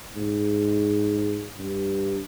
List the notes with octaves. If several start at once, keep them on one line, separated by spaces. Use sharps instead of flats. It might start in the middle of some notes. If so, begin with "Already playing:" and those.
G#2
G2